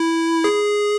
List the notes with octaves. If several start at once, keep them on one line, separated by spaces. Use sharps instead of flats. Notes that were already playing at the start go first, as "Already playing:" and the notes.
Already playing: E4
G#4